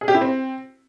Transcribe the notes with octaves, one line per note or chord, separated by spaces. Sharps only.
G#4
G4
E4
C4